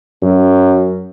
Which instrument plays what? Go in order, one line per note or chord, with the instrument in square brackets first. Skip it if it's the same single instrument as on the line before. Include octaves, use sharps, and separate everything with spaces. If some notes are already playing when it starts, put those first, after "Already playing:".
[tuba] F#2